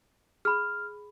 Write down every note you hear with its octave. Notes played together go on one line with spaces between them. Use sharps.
G#4 B5 F6